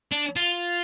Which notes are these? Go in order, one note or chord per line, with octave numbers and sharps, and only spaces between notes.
D4
F4